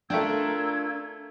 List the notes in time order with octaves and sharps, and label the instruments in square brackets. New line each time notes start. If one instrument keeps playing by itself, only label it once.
[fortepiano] A3 G5 [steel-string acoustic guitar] D4 F4 [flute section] A#4 E6 G#6